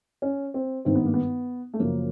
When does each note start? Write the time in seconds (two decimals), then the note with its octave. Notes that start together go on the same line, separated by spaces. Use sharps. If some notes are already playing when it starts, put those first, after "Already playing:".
0.22 C#4
0.54 C4
0.85 G#1 G2 D#3 C4
0.95 B3
1.05 A#3
1.14 B3
1.74 A3
1.79 F#2 C#3 F3 A#3